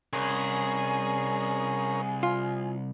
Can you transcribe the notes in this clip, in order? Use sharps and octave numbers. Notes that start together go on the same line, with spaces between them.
C2 C#4 G#4 A#4
F4